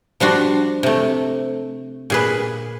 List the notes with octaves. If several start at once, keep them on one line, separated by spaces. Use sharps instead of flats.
F3 G3 D4 F#4
C3 A3
A#2 G#4 B4